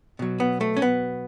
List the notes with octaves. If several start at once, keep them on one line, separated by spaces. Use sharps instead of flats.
B2 F#3
B3
A3
C#4
B3